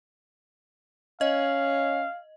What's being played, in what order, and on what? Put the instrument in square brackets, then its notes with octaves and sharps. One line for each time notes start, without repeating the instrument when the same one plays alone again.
[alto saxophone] C#4 [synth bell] D#5 [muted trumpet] F5